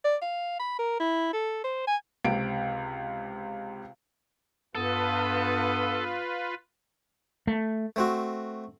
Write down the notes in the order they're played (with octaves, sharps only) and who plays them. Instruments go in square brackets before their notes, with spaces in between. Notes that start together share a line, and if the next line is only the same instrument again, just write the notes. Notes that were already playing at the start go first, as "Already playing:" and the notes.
[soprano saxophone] D5
F5
B5
A#4
E4
A4
C5
G#5
[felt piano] C#2 C3 D7
[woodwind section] G2 B3 D#6 [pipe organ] F4 B4 [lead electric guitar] A4
[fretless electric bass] A3
[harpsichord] A3 C4 F#4